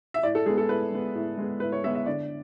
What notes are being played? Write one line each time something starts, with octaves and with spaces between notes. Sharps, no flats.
E5
A2 D5
A4
G#3 B3 G#4
A4
A2 B4
G#3 B3
A2
G#3 B3
A2 B4
C#5
G#3 B3 E5
E5
D3 D5